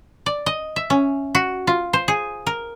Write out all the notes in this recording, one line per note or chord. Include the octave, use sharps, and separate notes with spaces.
D5
D#5
E5
C#4
F#4
F4
C5
G#4
A#4